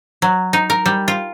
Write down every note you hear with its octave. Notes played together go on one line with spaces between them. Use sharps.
F#3
D#4
A#4
G3
F4